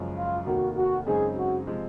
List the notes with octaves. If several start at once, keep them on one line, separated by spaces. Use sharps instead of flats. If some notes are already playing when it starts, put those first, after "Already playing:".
Already playing: F#1 F#2 F3 G#3
F4
F1 D#2 D#3 A#3 F#4
F#4
F#2 C#3 G#3 C4 D#4 G#4
F#4
C3 F3 G#3 C4